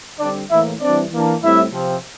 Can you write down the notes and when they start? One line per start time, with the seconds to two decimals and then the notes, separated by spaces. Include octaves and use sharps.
0.19 D3 G3 C4 D4 D5
0.50 A2 E3 A#3 E4 E5
0.80 E3 G3 C4 D4 D5
1.12 E3 A#3 D4
1.41 A2 G3 C4 E4 E5
1.72 C3 F3 C4